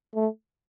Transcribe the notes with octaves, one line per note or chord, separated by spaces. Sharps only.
A3